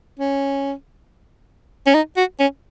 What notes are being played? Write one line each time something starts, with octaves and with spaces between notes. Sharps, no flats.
C#4
C#4
D#4
F#4
C#4